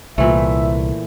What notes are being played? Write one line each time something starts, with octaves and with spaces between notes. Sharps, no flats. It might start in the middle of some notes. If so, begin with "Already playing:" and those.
C2 A#2 E3 A3 E5